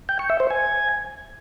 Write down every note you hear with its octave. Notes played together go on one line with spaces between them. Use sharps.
G5
C#6
E5
C5
G#5